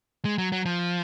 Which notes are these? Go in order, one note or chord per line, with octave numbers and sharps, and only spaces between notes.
G#3
F#3
F#3
F3